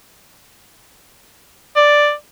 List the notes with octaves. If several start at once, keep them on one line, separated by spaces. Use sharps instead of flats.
D5